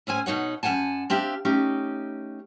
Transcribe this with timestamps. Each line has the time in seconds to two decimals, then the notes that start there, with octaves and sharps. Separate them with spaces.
0.07 A2 C#4 C5 G#5
0.26 B2 D#4 C#5 F#5
0.63 F#2 F#3 F#5 G#5 A5
1.10 C4 D4 G4 E5 F5
1.45 A3 C#4 D#4 G4